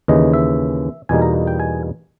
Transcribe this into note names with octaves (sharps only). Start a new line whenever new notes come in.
D#2 C#3 E3 D#5
E5
E2 B2 G3 A#3 D#4 G#5
A#5
G5
G#5